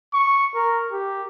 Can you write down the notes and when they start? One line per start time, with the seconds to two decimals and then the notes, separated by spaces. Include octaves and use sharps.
0.14 C#6
0.55 A#4
0.91 G4